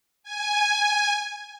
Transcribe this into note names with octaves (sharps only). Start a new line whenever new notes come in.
G#5